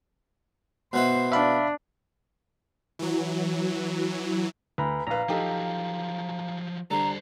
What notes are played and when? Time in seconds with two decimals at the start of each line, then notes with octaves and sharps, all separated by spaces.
0.93 B2 B3 E4 C5
1.32 D4 E5 F5 B5
2.99 E3 F#3
4.78 D2 B4 A#5 B5
5.07 A#1 B4 F5 A#5
5.29 F3 F#3 D#4 G4 A4
6.91 D3 G3 A4 C5 A#5